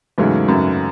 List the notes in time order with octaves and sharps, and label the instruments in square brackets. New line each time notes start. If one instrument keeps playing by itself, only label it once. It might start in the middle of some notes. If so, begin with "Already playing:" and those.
[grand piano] E2 C#3 F#3 A3 C#4 [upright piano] G#2
[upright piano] F#2